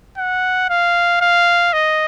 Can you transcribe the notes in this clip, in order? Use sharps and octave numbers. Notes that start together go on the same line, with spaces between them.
F#5
F5
F5
D#5